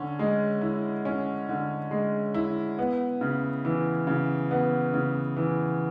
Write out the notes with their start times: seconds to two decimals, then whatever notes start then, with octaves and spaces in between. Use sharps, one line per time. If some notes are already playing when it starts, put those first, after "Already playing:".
Already playing: D3 C#4
0.19 G#3
0.62 E4
1.05 C#4
1.49 D3
1.91 G#3
2.34 E4
2.79 B3
3.21 C#3
3.65 E3
4.07 C#3
4.51 B3
4.94 C#3
5.37 E3